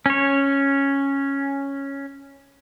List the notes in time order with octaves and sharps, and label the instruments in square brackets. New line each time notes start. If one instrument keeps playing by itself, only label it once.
[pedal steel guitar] C#4 C#5